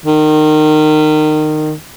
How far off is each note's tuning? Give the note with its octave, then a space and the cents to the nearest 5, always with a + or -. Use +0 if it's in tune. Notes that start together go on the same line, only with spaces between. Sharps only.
D#3 -25